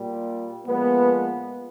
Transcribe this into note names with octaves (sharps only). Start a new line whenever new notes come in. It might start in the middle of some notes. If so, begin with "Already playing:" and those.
Already playing: A#2 G3
A#2 F3 G#3 B3